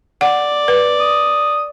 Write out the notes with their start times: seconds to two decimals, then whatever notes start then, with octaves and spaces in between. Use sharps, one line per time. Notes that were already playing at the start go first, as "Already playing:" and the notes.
0.21 D5 F#5
0.68 B4
0.99 D#6